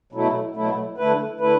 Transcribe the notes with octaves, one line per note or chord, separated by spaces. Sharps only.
B2 F#3 A3 E4
B2 F#3 A3 E4
D3 A3 E4 B4
D3 A3 E4 B4